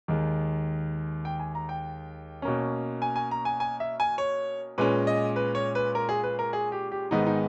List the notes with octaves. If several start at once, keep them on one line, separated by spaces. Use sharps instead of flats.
D#2 D#3 G#3
G5
G#5
A#5
G5
B2 A#3 C#4
G#5
G#5
A#5
G#5
G#5
E5
G#5
C#5
A#2 G#3 C#4 B4
D#5
B4
C#5
B4
A#4
G#4
B4
A#4
G#4
G4
G4
G#2 D#3 G#3 B3 D#4
D#4